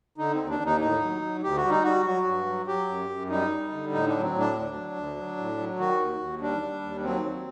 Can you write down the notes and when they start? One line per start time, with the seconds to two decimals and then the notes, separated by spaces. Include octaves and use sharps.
0.18 D3 D#4
0.35 D#2 C4
0.49 D4
0.60 D#2
0.65 D#4
0.81 A2 D#4
1.01 F#3
1.22 F#3
1.43 D2 G4
1.57 F#4
1.63 G3
1.70 D#4
1.83 G3 F#4
2.05 F#3 F#4
2.26 G2
2.46 F#3
2.67 F#3 G4
2.88 F#2
3.09 F#2
3.30 G3 D#4
3.51 G3
3.71 D3
3.92 A2 D#4
4.08 F#3 D4
4.23 C4
4.34 A2 D4
4.54 D2
4.75 F#3
4.96 D2
5.16 F#3
5.37 A2
5.58 F#3
5.79 D#3 F#4
5.99 D#2
6.20 D#2
6.41 G3 D4
6.62 G3
6.82 D#2
7.03 F#3 C4
7.24 F#3